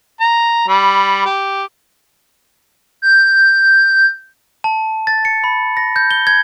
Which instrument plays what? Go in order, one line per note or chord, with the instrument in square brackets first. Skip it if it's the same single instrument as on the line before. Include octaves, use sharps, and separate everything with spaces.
[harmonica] A#5
G3 B5
G4
[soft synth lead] G6
[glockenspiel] A5
A6
C#7
B5
A#6
G6
G7
G#6